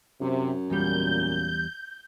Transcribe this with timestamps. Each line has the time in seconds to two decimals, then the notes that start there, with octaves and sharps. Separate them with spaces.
0.21 F#2 C3
0.70 E2 A#2 G3 G6